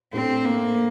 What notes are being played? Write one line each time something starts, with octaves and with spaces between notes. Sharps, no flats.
A2 A3 C4 D4 A4 C5
A#3